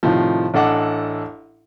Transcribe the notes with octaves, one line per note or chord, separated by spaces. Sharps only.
A2 C3 D#3 F3
A1 D4 A4 D#5 F#5 D6